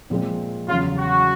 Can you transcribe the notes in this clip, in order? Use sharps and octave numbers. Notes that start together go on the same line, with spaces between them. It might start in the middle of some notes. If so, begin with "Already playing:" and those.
A#2 F3 G#3 C4
E2 C#3 F#3 F4
F#4